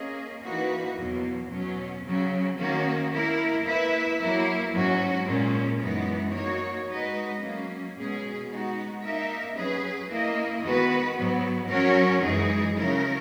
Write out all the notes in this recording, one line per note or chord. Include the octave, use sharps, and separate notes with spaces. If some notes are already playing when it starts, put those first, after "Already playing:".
Already playing: A#3 C#4 G#4 D#5
E3 A#3 D#4 F#4 B4
E2 B2 F#3 A#3
B2 F#3 C#4
C#3 F#3 C#4
D#3 A#3 C#4 F#4
A#3 E4 A#4
A#3 E4 B4 E5
F#3 A#3 E4
G#2 F#3 C#4 F#4
A#2 G#3 C#4
F#2 E3 G#3 B3 D#4
A#3 D#4 F#4 C#5
G#3 D#4 F#4 B4 D#5
F#3 A#3 C#4
B2 G#3 C#4 G#4
G#3 B3 D#4 F#4
A#3 D#4 A#4 E5
F#3 C#4 G#4 B4
A#3 E4 A#4 D#5
D#3 G#3 B3 F#4 B4
G#2 F#3 B3
F#3 C#4 F#4 A#4 C#5
F#2 E3 G#3 D#4 G#4
C#3 F#3 C#4 E4 A#4